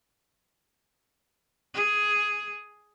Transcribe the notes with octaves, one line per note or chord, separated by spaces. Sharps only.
G#4